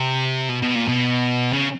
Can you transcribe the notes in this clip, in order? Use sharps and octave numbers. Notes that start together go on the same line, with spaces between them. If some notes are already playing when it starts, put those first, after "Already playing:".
Already playing: C3
B2
B2
A#2
B2
C#3